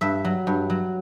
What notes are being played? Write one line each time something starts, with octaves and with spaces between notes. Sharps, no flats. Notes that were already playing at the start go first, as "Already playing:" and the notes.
G2 E5
F#3
G2
F#3